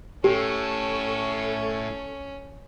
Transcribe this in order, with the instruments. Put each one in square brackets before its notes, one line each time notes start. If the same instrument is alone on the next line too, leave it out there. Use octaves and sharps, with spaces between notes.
[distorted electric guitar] A2 [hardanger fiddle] C#4 [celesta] G4 [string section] A4 C#6